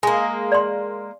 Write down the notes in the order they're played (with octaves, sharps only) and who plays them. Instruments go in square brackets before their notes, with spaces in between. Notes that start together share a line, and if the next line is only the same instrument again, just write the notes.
[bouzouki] G#3 A#3 [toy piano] G#5
[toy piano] D5 C6